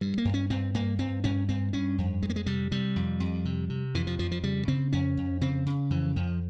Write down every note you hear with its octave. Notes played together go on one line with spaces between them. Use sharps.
G2 G3
A#3
G2
C#4
G2 C4
G2 A#3
G2 C4
G2 C#4
G2 C4
G2 C#4
F2
F2 G#3
A#3
G#3
C3 G3
C3 G3
F2
F2
C3
C3
F2 E3
F3
F2 F3
F3
C#3 G3
C#3 C4
F2 C#4
F2
C#3 C4
C#3
F2 E3
F2 F3